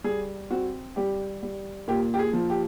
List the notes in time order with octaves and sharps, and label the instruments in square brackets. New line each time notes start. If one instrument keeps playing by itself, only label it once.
[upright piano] G3 G#4
C4 F#4
G3 G4
G3
A#2 G4
G4
G#4
F3
G4